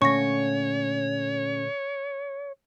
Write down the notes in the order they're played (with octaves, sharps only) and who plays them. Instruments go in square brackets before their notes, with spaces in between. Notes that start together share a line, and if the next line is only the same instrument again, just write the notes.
[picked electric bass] A#2 D3 A3 [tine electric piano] C#4 [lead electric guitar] C#5 [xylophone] C#6 A#6